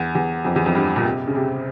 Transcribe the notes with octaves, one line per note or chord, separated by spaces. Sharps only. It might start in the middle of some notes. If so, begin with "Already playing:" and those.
Already playing: E2
E2
F2
E2
F2
G2
A#2
C3
C#3
C3